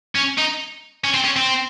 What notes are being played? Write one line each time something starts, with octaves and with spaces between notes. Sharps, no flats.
C#4
D#4
C#4
C4
C#4
C4